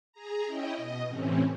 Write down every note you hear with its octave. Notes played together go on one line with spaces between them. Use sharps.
G#4 A#5
C#4 E4 D#5 G5
B2 D#5
A2 C3 E3 C4 C#4